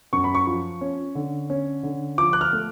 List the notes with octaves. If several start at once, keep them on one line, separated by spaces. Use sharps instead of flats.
F#2 C#6
B5
C#6
F3
C#4
D3
C#4
D3
F3 D6
F#6
F6
A3